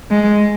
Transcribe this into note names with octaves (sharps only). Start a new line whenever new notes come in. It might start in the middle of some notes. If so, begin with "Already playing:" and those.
G#3